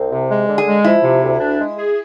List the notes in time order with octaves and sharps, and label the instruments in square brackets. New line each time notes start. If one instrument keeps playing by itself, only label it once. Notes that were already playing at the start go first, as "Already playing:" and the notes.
Already playing: [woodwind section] C2 [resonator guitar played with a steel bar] C4
[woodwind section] C3
G#3
D3
[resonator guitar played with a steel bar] G#4
[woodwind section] G#3
[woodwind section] F3 [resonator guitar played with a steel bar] E4
[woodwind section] C3
D2
D4
G#3
G#4